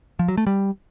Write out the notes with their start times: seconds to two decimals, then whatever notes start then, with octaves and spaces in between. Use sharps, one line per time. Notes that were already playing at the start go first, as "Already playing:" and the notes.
0.19 F3
0.28 F#3
0.38 A3
0.47 G3